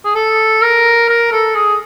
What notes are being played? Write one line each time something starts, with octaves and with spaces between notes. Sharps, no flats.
G#4
A4
A#4
A#4
A4
G#4